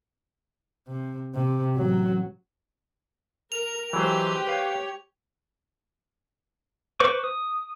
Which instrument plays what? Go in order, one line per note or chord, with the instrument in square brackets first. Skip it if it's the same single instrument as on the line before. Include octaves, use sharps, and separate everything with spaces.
[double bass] C3
C3
A1 F#3
[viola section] A#4 [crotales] F7
[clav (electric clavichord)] E3 F#3 [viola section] G#3 B4 C5 [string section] G4
[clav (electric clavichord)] B4 F5 [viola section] C#5
[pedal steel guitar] B4 C5 C#6 D6
D#6